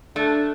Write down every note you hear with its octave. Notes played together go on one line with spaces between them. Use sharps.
A3 D4